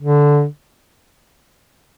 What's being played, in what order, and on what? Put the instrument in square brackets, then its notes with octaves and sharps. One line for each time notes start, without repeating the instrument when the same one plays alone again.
[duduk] D3